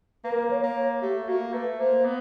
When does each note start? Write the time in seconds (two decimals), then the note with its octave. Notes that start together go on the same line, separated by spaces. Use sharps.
0.24 A#3 B4
0.32 A#4
0.40 B4
0.50 C#5
0.63 A#3
0.76 C#5
1.02 A3 G4
1.28 A#3 F#4
1.53 A3 B4
1.79 A#3 C5
2.05 B3